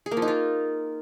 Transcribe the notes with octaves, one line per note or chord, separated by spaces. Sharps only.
G#4
A#3
F3
D#4
F4